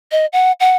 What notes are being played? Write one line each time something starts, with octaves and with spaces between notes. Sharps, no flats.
D#5
F#5
F#5